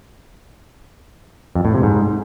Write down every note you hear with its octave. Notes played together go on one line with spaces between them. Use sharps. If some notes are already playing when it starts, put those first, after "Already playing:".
F2
A2
C3
G#2